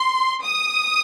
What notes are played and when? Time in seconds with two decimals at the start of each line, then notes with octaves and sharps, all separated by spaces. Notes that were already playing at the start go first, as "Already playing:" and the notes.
Already playing: C6
0.44 D#6